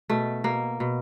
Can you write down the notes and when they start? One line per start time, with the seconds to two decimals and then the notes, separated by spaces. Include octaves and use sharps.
0.10 B2 A3
0.44 B2 A#3
0.80 B2